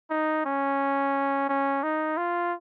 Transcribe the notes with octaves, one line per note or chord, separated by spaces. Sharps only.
D#4
C#4
C#4
D#4
F4